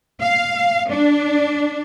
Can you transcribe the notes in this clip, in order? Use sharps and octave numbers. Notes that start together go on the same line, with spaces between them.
F5
D4